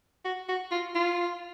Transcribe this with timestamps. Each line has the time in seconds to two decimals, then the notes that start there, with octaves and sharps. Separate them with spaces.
0.25 F#4
0.49 F#4
0.71 F4
0.95 F4